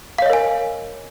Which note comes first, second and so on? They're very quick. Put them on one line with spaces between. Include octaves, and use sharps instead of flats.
F5 C#5 D#5 A#4 G#5